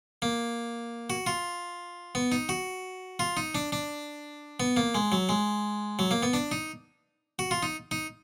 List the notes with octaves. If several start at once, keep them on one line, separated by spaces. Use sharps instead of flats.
A#3
F#4
F4
B3
D#4
F#4
F4
D#4
D4
D4
B3
A#3
G#3
F#3
G#3
F#3
A#3
B3
D4
D#4
F#4
F4
D#4
D#4